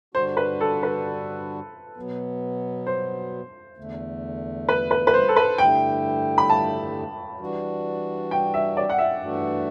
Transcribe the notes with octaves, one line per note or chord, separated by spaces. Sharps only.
G2 D3 G3 D4 F#4 C5
B4
A4
B4
B2 F#3 B3
C5
E2 D3 A3
B4
B4
B4
C5
A4
B4
G2 D3 A3 E4 G4 G5
B5
A5
E3 G3 D4 F#4
G5
E5
D5
F#5
E5
G2 E3 A3 D4 F#4